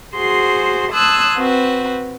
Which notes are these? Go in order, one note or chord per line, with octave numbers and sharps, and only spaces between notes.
F#4 G#4 C5 C6
A5 C6 D#6 E6 F#6 G#6
C4 F#4 B4